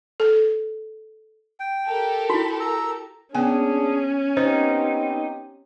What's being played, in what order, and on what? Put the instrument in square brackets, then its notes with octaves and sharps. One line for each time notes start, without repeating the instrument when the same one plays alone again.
[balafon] A4
[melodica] G5
[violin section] G4 A4 A#4
[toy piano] E4 F#4 [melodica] B5
[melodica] A#5 E6
[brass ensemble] A#3 D4 G#4 [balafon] B3 G#5 [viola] C#4
[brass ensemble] B3 C4 G4 [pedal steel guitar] D#4 [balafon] C5